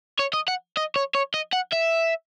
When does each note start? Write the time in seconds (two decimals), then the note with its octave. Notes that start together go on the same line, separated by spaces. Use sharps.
0.19 C#5
0.33 D#5
0.48 F#5
0.77 D#5
0.96 C#5
1.15 C#5
1.34 D#5
1.53 F#5
1.72 E5